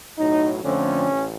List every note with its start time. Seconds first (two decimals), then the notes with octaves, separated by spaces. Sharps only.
0.18 B1 A2 F#3 D#4
0.63 F2 D3 F3 A3 C4 C#4
1.07 A1